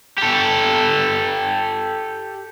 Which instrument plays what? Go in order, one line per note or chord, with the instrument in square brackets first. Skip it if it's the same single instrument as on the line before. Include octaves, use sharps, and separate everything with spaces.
[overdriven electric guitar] G4 A4